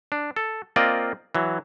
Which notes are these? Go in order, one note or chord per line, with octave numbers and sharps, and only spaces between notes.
D4
A4
A#3 C4 F4 D5 D#5
E3 F#3